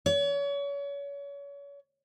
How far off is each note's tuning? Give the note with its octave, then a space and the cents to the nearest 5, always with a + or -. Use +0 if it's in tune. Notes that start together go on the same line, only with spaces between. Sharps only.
C#5 +35